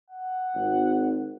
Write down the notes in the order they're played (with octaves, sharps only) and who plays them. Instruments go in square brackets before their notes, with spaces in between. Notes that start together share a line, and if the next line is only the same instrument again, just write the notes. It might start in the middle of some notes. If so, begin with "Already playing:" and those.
[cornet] F#5
[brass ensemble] G#1